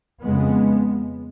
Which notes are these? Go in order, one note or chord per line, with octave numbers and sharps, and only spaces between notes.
F2 C#3 G#3 B3